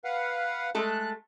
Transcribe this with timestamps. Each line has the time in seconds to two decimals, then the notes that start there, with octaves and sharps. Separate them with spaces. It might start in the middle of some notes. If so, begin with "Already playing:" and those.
0.04 B4 F5 F#5
0.75 G#3 A3 A4 F#6